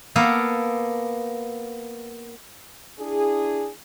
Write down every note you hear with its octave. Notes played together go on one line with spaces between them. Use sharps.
A#3 B3 A4 F5
D4 E4 G#4